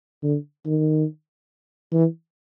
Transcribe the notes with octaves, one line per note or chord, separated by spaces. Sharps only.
D3
D#3
E3